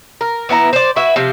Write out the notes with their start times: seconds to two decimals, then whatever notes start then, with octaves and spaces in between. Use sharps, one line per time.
0.21 A#4
0.49 E3 B3 E4 A#5
0.73 C5 D5
0.96 E4 F#4 B4 E5
1.16 C3 F3 F4